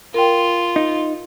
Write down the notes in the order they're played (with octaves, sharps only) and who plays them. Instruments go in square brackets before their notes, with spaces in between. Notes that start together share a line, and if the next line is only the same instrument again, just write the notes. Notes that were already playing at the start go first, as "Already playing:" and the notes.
[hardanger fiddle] F4 [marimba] A#4 G5
[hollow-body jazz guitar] D#4